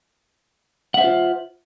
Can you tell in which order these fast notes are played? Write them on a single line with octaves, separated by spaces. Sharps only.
F#5 E5 C5 F4